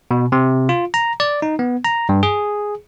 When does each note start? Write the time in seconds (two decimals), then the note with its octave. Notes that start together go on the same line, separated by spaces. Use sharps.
0.11 B2
0.32 C3
0.69 F4
0.94 A#5
1.20 D5
1.42 D#4
1.59 B3
1.84 A#5
2.09 G2
2.23 G#4